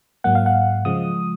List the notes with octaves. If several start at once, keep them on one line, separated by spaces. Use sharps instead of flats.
G#2 F#3 A#3 F#5
F5
F#5
C#3 F3 G#3 D#6